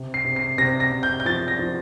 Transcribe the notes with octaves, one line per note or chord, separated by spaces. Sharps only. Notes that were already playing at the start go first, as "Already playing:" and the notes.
Already playing: C3
C7
C3
C7
C3 A#6
A#6
C3
G6
G6
F3 A6
A#6
F3